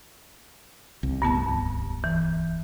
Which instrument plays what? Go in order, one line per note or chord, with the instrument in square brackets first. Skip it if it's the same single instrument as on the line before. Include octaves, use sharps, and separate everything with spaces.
[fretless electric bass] C2
[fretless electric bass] D1 C2 [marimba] G2 B3 A5
[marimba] E3